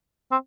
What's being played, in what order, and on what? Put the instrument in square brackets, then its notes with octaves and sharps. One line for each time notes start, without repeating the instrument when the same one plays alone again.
[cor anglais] C4